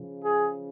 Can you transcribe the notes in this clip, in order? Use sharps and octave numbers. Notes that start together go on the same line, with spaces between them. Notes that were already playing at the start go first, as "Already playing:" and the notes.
Already playing: C#3 F3
G#4